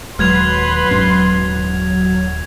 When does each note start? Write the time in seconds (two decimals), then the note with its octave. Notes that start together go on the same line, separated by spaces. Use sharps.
0.19 D#1 F#3 G#3 B4 C6 F6 G#6 F7
0.91 D#1 G#2 C#4